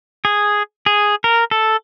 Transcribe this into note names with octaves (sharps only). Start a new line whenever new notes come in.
G#4
G#4
A#4
A4